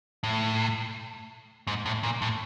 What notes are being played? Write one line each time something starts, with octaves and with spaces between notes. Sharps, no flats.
A2
G#2
A2
A#2
A2